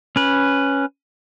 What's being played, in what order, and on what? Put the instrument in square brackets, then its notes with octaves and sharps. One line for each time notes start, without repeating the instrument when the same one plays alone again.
[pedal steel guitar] C#4 B4